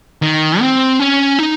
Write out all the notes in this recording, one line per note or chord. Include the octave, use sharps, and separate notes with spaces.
D#3
C4
C#4
D#4